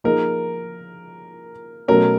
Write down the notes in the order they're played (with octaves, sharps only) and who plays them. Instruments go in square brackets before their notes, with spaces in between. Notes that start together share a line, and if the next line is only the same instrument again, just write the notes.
[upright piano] F3 A#3 D#4 G#4 [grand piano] A#4
[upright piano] B2 F#3 A3 C#4 [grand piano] A#4